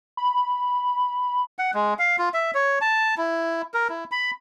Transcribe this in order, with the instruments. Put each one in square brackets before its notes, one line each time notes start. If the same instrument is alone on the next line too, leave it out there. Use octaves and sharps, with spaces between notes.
[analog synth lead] B5
[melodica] F#5
G#3
F5
F4
E5
C#5
A5
E4
A#4
E4
B5